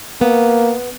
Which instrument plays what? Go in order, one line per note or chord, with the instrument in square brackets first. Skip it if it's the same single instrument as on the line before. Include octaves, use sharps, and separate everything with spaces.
[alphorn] A#3 [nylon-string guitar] B3